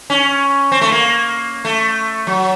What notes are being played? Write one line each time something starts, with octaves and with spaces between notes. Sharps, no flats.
C#4
C4
A3
A#3
A3
F#3